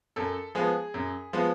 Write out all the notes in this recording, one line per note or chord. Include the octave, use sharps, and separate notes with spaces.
F#2 A4
F3 G#3 B3 G#4
F#2
F3 G#3 B3